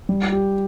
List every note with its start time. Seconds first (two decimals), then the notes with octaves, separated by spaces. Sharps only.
0.09 G3
0.32 G4